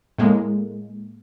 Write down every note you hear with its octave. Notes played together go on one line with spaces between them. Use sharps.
A2 G#3 A#3